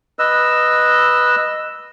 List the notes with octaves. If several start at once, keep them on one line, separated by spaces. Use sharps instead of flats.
B4 D#5 E6